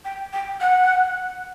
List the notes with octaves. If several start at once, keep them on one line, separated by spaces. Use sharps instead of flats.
G5
G5
F#5